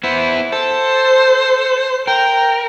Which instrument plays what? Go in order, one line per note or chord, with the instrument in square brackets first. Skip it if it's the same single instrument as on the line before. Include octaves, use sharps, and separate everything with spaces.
[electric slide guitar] B3 E4 [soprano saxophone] C5
[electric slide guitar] A4 [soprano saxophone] C5
[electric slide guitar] A#4 [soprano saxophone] G5